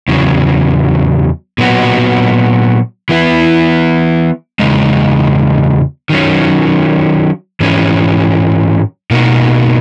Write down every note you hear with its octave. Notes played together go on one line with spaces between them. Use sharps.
E2 C#3 F#3
A#2 F#3 B3 F#4
E3 B3 E4
E2 C#3 G#3 D#4
D#3 F#3 C#4
G#2 E3 G#3 C#4
B2 A#3 D#4 F#4